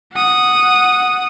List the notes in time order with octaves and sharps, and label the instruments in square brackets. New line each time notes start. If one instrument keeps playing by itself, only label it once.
[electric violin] F#5 D#6